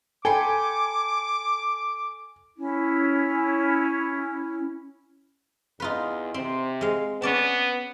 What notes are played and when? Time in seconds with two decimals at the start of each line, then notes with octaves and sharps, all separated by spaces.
0.25 A4 G5 G#5 B5 C6 D6
2.57 C#4 E4
5.80 E2 D#4 F4 B4
6.34 C3 C4
6.81 G#3 F5
7.22 B3 C#4 D5 A5